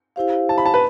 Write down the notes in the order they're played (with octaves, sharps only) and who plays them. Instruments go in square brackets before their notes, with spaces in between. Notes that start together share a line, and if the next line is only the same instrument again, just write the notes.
[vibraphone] E4 G4 C5 F5
[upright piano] A5
B5
A5
B4